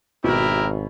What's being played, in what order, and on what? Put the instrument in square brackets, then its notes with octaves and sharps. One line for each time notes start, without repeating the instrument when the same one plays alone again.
[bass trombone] G#1 [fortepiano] B2 [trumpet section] E4 G4 A#4